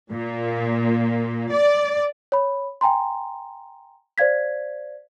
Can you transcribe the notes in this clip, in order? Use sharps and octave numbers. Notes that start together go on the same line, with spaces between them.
A#2
D5
C#5 B5
G5 G#5 A#5 C6
C5 D5 F5 G#6 B6